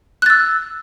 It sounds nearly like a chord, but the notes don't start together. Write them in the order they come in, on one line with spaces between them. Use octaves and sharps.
F#6 A6 E6